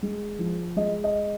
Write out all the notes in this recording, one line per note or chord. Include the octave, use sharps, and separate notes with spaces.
G#3
F3
G#3 D#5
D#5